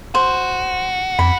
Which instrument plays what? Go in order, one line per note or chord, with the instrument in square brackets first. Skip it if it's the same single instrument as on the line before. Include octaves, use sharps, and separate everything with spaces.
[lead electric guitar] F#4 [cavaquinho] C5
[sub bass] F2 [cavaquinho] B5